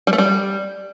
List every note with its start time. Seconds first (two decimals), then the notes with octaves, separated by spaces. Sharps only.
0.07 G3
0.13 A3
0.18 G3